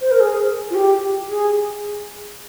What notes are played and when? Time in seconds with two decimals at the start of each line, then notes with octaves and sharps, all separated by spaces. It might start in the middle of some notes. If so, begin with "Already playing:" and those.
0.01 C5
0.11 A#4
0.20 G#4
0.70 F4
0.75 G4
1.30 G#4